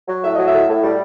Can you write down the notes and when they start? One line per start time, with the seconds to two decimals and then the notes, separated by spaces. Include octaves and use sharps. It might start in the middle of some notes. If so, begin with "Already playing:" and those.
0.08 F#3
0.23 A2 E5
0.35 F#3 D#5
0.47 E5
0.53 A2
0.68 A2
0.84 G3